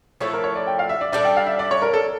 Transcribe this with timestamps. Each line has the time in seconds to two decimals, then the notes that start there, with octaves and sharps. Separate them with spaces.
0.21 F3 A3 E4 A4 C#5
0.33 A#4
0.44 C#5
0.56 D5
0.67 G5
0.79 F5
0.89 E5
1.01 D5
1.12 G3 D4 A4 D5
1.25 G5
1.37 F5
1.47 E5
1.59 D5
1.71 C#5
1.82 A#4
1.93 A4